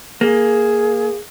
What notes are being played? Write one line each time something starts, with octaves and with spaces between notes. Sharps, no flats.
A#3 G#4